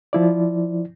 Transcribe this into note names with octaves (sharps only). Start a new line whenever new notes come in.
F3 E4 D5